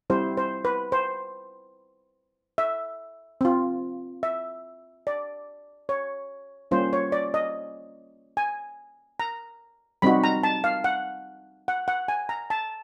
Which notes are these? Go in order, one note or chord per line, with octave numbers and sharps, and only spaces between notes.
G3 C4 E4 G4 C5
C5
B4
C5
E5
C4 F4
E5
D5
C#5
G3 A#3 C#4 F4 C5
C#5
D5
D#5
G#5
A#5
G3 C4 D#4 F#4 B5
A#5
A5
F5
F#5
F#5
F#5
G#5
A#5
A5